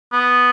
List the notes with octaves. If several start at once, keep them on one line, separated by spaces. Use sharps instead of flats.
B3